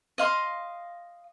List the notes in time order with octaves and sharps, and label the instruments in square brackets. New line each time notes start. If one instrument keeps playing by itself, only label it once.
[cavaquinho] D#5 F5 C6